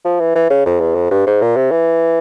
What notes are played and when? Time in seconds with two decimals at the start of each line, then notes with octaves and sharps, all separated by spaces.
0.05 F3
0.20 E3
0.35 E3
0.50 C#3
0.66 F2
0.81 E2
0.95 F2
1.11 G2
1.27 G#2
1.42 A#2
1.56 C3
1.71 E3